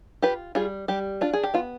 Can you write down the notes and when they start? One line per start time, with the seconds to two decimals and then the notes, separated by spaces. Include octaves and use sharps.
0.22 F4 G4 B4
0.55 G3 F4 G#4
0.88 G3 G4
1.21 D4 F4
1.33 G#4
1.44 G4
1.54 B3 F4